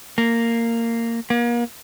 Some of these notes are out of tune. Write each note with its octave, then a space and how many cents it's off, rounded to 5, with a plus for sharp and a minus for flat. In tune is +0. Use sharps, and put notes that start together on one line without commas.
A#3 -15
A#3 +35